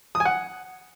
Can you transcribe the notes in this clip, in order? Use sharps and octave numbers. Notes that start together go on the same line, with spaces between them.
D#6
G#5
F#5